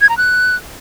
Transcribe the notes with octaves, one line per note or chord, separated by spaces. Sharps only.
G#6
A#5
F#6